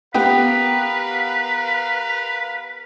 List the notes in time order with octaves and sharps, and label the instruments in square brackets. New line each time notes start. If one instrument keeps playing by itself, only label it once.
[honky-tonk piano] B3 G4 [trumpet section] A#4 F5 [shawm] B4